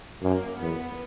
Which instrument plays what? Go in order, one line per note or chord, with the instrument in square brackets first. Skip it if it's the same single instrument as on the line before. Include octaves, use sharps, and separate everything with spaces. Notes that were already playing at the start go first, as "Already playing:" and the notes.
[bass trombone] F#2 [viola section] A#3
[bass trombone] E2 [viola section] B3